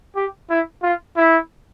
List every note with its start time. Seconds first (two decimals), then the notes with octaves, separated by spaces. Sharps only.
0.16 G4
0.50 E4
0.83 F4
1.17 E4